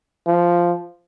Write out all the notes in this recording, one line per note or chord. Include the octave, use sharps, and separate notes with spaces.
F3